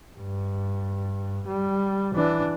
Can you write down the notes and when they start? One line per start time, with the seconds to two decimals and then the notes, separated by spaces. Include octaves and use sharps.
0.19 G2
1.48 G3
2.14 E3 D4